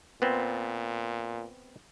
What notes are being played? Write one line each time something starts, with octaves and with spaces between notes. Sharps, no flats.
A#2 B3 C4